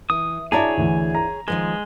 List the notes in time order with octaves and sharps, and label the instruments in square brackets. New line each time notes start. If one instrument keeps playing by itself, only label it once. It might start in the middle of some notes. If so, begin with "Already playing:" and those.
[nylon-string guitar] E3 [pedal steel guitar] D#6
[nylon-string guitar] D4 E4 F#4 [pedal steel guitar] G#4 C#5 [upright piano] D5 A5 A#5
[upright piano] D2 E3
A#5
[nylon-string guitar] D#3 F3 B4 [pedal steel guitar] G#3